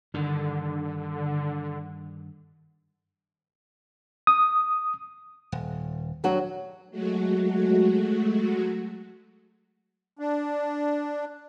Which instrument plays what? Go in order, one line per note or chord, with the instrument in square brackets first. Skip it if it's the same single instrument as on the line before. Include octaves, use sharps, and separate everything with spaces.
[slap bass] G2 D#3 [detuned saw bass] D3
[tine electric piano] D#6
[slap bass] D#1
[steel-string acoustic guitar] G2 F#3 F#4
[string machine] F#3 G#3 A3 F#4
[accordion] D4